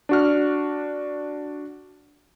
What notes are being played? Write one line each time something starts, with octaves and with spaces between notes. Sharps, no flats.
D4 F#4 F6